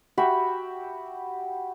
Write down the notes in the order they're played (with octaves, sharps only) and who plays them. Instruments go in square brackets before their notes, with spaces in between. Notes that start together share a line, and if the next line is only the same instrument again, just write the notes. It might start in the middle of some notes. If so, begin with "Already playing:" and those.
[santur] F#4 G4 E5 B5